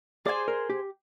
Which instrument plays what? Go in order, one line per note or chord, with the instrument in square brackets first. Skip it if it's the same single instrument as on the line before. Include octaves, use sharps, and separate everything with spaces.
[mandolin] G#4 C5 F5 G#5 [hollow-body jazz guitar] D5
[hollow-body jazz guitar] A#4
G4